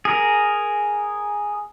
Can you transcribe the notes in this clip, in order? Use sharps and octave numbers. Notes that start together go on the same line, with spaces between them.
G#4 A#4